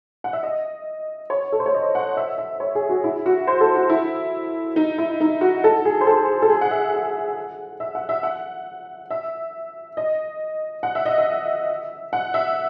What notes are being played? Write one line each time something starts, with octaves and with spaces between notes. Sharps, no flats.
F#5
E5
D#5
C#5
A4
C5
C#5
D#5
F#5
E5
E5
C#5
G#4
F#4
E4
F#4
C5
A4
F#4
E4
D#4
E4
D#4
F#4
A4
G#4
C5
A4
A4
G#4
F#5
E5
F#5
E5
F#5
E5
F#5
E5
D#5
F#5
E5
D#5
E5
F#5
E5